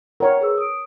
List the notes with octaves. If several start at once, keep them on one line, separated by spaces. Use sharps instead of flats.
A#4 C#5 F#5 G5 C#6
G#4 B4 E6
D#6 D7